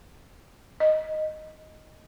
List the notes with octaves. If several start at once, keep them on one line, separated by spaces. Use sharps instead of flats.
D#5